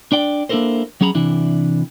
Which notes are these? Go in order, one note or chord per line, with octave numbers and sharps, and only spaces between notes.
D4 D5 G5
A#3 D4 E4 A4 A#4 C5
F#3 C#4 G#4 A#5 B5
C3 E3 D4 E4